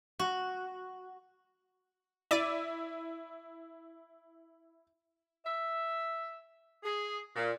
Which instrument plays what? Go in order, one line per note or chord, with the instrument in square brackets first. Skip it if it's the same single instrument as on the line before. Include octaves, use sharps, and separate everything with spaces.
[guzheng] F#4
[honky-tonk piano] E4 [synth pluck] D5 D6 D#7
[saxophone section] E5
G#4
A#2